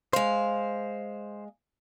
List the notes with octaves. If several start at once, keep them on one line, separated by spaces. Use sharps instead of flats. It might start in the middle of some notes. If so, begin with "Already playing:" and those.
G#3 C5 F5